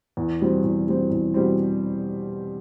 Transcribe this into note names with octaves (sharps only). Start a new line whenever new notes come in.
E2
B2 G3 C4
E2
B2 G3 C4
E2
B2 G3 C4